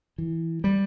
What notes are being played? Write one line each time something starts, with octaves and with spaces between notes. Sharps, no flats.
E3
G3